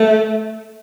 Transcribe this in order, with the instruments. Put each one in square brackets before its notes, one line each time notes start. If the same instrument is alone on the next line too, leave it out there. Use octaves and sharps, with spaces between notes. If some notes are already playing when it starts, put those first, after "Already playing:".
Already playing: [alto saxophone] A3